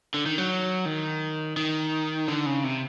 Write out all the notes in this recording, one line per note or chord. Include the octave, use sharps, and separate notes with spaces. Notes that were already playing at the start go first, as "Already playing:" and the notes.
D3
D#3
F#3
D#3
D#3
D3
C#3
C3